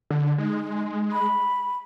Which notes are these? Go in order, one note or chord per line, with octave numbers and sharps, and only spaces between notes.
D3
G#3 D#4
B5